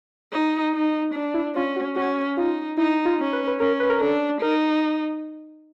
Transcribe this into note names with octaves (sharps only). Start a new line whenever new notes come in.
D#4
D#4
D4
E4
C#4 F4
F#4
C#4 F#4
D#4 F4
D#4 E4
F4
C#4
B4
B4
C#4 A#4
B4
A#4
D4 A4
D#4 A#4